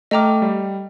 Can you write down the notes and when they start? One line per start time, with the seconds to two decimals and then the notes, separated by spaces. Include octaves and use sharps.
0.11 A3 D#5 G5 A#5 D6 F6
0.42 G3